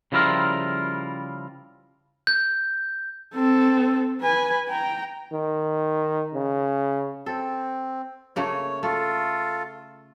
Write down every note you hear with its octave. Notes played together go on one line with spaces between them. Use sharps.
C#3 F3 G3 E4 F4 A#4
G6
C4 A4
B4 G#5
G5 A#5
D#3
C#3
C4 A4
C#3 A3 A#3 C#5
A3 F4 A4